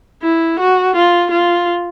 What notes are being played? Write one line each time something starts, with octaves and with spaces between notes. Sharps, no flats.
E4
F#4
F4
F4